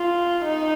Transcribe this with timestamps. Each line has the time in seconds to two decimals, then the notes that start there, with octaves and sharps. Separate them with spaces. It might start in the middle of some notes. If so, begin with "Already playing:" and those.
Already playing: F4
0.44 D#4